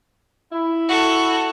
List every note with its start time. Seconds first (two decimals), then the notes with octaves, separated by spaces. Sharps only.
0.52 E4
0.88 F#4 A4